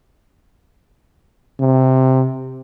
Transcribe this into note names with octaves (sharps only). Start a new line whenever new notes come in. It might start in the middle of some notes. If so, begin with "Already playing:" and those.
C3